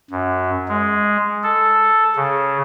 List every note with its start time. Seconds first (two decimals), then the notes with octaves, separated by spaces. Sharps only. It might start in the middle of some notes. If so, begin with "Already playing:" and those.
0.11 F#2
0.69 G#3
1.43 A4
2.16 C#3